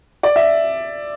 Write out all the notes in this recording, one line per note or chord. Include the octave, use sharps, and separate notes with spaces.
D5
E5